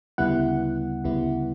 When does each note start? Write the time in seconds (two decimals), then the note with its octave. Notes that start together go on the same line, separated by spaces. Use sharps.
0.18 D2 C#3 G3 B3 E4 F#5
1.04 D2 C#3 G3 B3 E4